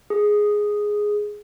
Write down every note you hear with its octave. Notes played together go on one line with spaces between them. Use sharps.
G#4